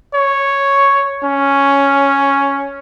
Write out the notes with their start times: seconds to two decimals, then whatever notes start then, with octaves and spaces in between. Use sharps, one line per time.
0.14 C#5
1.23 C#4